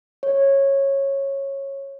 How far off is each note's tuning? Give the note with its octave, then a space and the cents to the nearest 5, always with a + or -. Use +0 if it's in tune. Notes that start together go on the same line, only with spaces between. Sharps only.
C#5 -15